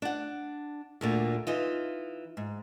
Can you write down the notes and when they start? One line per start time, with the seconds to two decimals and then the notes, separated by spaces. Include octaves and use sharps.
0.02 D4 F#5
1.01 D2 A#2 D3
1.47 E3 D#4 F4
2.37 G#2